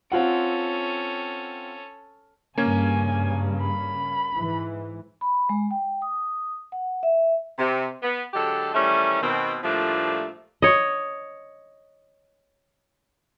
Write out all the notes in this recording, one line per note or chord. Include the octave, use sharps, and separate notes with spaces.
C4 C#4 F4 A4 F#5
G2 C#3 A#3 C#4 G#5 G#6
B5
G#2 E3
B5
G#3
G5
D#6
F#5
E5
C3
B3
D3 F#3 G#3 G4 A4
D#3 E3 G3 A3 C#4
B2 D#3 C4
A2 F3 G3 A3 A#3 D4
C#5 D#5